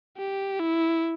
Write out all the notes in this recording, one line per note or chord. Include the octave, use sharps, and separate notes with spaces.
G4
E4